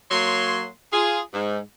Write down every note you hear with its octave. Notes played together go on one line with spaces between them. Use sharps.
F#3 A#3 C#5 C6
F4 G#4
G#2